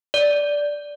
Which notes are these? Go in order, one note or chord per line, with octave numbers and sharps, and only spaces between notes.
D5